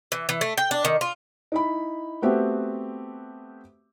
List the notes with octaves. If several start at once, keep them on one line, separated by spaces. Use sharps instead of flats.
E3
E3
A3
G5
D4
D#3
F4
D#4 E4 B5
A3 B3 C4 F#4 G4 E5